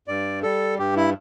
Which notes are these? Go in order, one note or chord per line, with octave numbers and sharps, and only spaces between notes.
G2 D5
G3 A4
G2 G4
E4